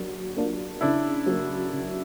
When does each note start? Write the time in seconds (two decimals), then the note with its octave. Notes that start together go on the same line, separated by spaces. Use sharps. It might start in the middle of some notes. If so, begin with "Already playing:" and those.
Already playing: F#3 A#3 D4
0.37 A#3 D4 F4
0.81 C#3 D4 E4
1.26 F#3 A#3
1.72 C#3